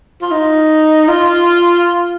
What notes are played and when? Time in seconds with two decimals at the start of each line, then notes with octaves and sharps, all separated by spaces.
0.22 F4
0.31 D#4
1.08 F4